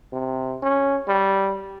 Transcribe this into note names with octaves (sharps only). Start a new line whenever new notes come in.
C3
C#4
G3